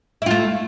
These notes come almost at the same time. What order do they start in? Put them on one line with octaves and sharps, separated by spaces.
E4 F4 A3